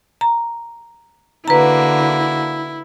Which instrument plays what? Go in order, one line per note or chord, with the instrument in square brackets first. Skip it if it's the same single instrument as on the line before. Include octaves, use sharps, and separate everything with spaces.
[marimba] A#5
[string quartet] D3 A#3 F#4 [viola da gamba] E4 [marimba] B4 A#5